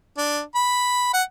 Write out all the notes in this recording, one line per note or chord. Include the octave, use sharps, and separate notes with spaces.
D4
B5
F#5